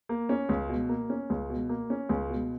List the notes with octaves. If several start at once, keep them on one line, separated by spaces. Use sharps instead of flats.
A#3
C#4
C#2
B2
A#3
C#4
C#2
B2
A#3
C#4
C#2
B2